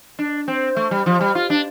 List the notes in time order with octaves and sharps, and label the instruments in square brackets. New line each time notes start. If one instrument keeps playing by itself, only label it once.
[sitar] D4
C4
A3
G3
F3
G3
F4
D4